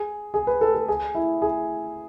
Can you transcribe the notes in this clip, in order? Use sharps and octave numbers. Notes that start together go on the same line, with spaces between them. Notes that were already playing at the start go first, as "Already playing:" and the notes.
Already playing: G#4
G#4
B4
A4
A4
G#4
E4
G#4